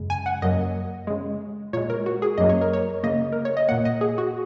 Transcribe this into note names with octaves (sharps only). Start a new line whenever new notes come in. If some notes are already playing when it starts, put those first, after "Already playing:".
Already playing: F#2 C#3 G#3
G#5
F#5
F#2 F#3 A#3 D#5
C#3 G#3
A#2 G#3 C#5
A#4
F#4
G#4
F#2 F#3 A#3 D#5
C#5
A#4
C#5
C#3 A#3 D#5
A#4
C#5
D#5
A#2 A#3 F#5
D#5
G#4
F#4